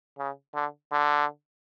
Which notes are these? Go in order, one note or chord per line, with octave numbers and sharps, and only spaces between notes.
C#3
D3
D3